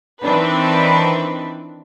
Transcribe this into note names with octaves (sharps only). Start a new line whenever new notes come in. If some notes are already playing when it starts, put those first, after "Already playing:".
D#3 E3 C4 D4 B4